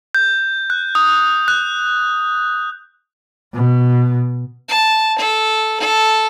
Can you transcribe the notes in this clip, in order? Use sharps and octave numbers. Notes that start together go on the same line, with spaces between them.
G6
F#6
D#6
F#6
B2
A5
A4
A4